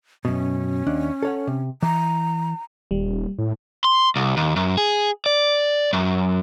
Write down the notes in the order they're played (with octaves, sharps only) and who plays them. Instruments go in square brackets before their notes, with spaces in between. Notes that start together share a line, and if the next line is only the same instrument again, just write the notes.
[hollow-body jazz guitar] F#2 B2 [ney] C#4
[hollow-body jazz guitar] D#2 D4
A4 C#5 F#5
C3
[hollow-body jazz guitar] E3 [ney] A#5
[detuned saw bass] D#1 [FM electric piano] G3
[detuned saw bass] A2
[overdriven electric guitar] C6
C2
D#2
F#2
G#4
D5
F#2